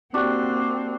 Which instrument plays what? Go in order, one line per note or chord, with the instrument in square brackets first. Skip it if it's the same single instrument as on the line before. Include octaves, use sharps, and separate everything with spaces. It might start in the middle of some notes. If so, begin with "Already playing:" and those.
[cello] A#3 C4 [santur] D4 F#4 G4